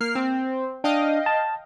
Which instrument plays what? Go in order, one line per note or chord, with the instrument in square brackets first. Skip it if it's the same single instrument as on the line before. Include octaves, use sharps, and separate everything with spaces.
[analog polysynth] A#3 F6 C7
C4
[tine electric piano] D4 [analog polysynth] D#5 F5 G5
[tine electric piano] A5